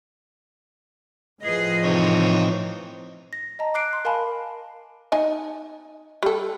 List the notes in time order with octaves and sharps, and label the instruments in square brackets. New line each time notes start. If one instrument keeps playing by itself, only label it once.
[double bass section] A2 F3 [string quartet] G#4 B4 D#5
[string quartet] C3 E3 [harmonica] C4 D#4 C#5
[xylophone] A#6
D#5 A5 A#5
D6 F#6 C7 D7
C6
A#4 F5 G#5 A5 B5
[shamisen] D#4 G#5 A5
G3 A4